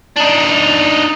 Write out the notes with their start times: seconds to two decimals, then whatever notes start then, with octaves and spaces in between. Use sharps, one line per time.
0.16 D4 D#4